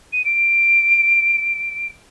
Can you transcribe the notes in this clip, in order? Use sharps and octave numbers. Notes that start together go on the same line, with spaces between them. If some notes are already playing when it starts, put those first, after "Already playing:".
D#7
D7